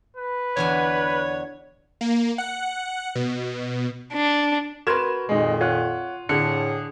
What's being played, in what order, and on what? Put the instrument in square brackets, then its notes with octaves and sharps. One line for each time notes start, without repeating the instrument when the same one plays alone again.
[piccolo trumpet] B4
[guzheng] E2 D3 G#5 [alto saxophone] C#5
[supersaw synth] A#3
F#5
B2
[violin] D4
[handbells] F#4 [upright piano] A#4 B4 [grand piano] C6 G#6 E7
[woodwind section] F2 A#2 D#3 [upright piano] G#3 D#4
[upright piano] F4 [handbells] C#5 F#5 F#6
[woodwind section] A2 G#4 [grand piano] D3 [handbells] C#7